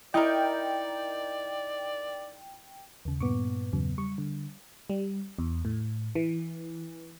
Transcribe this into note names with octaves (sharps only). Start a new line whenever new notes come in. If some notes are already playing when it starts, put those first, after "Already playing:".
D#4 E4 A#4 D5 G5 D#6 G6
D#2 C#3
G2 A#2 B3 C#6 D6
E2 C#3 F#3
G3 C#6
D3
G3
E2
A2
E3